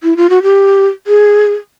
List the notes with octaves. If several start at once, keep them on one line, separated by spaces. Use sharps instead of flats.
E4
F4
F#4
G4
G#4